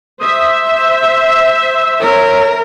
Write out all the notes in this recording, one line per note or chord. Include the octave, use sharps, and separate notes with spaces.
C5 E5 D#6
E6
A#4 C#5